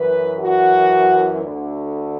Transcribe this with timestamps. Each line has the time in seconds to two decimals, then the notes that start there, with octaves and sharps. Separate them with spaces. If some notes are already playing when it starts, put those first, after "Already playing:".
Already playing: F#2 E3 B4
0.39 F#4
1.42 D2 D3